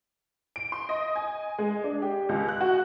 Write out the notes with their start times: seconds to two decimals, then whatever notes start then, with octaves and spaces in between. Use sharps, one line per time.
0.56 D7
0.72 C6
0.89 D#5
1.16 G#5
1.58 G#3
1.84 D4
2.02 G4
2.29 C#2
2.48 F#6
2.61 F#4